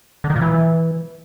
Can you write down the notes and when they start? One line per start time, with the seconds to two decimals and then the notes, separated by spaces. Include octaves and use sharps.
0.24 D3
0.30 D#3
0.36 A#2
0.41 E3